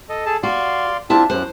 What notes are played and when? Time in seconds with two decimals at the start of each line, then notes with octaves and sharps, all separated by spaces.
0.09 A4 D#5
0.26 G#4 A4 A5
0.43 F#4 D5 F5 C6
1.10 C4 D4 E4 F4 A5
1.30 F#2 C5 F#6